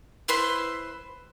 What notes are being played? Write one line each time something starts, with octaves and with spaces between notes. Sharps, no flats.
E4 B4 C5 C6